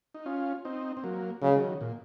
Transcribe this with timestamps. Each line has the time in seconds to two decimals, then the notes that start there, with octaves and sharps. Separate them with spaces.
0.14 D#4
0.26 C#4 F4
0.65 C4 D#4
0.97 C4
1.04 F#3 A#3
1.42 C#3 F#3
1.50 G#3
1.56 D#3 F#3
1.81 A#2